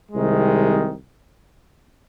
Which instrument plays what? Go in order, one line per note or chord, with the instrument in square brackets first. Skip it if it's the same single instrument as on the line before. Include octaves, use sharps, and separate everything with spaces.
[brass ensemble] C2 C3 D#3 G#3